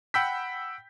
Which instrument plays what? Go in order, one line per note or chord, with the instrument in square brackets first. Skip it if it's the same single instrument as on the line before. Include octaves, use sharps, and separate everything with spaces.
[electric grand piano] F#5 G5 B5 E6 G6 B6